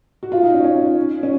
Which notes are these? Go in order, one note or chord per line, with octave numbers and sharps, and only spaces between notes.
F#4
F4
D#4
C#4
C#4
C#4